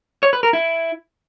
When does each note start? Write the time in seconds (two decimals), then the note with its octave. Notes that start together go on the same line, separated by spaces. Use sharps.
0.23 C#5
0.33 B4
0.43 A#4
0.53 E4